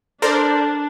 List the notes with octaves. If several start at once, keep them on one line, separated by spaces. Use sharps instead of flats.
D4 A4 A#4 C5 D5